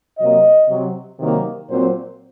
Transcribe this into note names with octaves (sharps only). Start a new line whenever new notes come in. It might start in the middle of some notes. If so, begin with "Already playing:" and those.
C3 F#3 A#3 D#5
C3 F#3 C4
C3 D#3 F#3 A#3
A#2 F#3 C4 C5